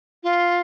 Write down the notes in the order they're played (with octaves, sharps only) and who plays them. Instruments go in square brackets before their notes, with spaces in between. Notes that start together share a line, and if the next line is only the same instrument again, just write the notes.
[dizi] F4